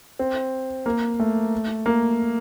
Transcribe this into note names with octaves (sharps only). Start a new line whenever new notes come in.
C4
A#3
A3
A#3